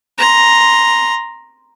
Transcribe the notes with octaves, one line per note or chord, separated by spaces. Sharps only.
A#5 C6